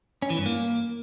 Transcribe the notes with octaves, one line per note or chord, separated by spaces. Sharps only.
C#4
E3
G2
A#3